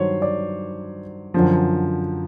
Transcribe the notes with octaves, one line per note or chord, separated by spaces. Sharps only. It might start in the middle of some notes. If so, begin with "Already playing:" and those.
Already playing: G2 D#3 F#3 C5 C#5
D5
F#2 D3 F3